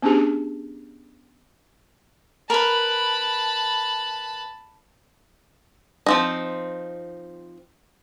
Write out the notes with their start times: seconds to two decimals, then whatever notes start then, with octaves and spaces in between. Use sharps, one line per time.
0.03 B3 C#4 D4 G4 G#4
2.50 A#4 B4 A5 B5
6.06 F3 C4 D#4